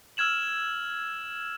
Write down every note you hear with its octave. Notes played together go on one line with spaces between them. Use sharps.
E6 F6 G#6 E7 F#7